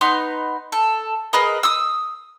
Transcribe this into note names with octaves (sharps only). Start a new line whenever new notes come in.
B3 D#4 C6
A4
G#4 A#4 B4 D#5
D#6 E6